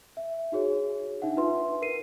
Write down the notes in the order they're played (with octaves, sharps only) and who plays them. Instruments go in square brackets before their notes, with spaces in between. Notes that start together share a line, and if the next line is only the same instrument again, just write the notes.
[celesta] E5
D#4 F#4 G#4 C#5
D4 D#4 E5 F#5
D#4 F4 B4 E5 C6
A#4 B4 C7 D#7